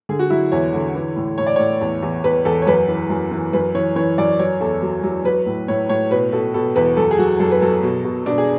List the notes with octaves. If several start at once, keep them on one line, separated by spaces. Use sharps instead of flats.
D3 G#4
F#4
F#3 E4
E2 C#5
D3
E3
A2
A2 C#5
D5
A2 C#5
E2
E2
E2 B4
E2 A4
C#5
F#2 B4
E3
F#2
E3
F#2 B4
E3 C#5
E3 C#5
F#2 D5
F#3 C#5
E2 A4
F#3
F#3
F#3 B4
A2
A2 C#5
A2 C#5
B2 B4
B2 A4
B2 A4
E2 B4
F#2 A4
G#4
F#3 F#4
F#2 A4
B4
F#3 A4
B2
B2
B2 D4
G#4